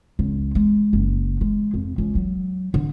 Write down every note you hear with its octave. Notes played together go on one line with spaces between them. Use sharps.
C#2
G#3
F#1
G#3
F2
C#2
F#3
D3